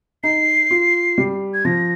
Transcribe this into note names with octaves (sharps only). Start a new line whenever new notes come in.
D#4 C7
F4
G3
G#6
F3 A#6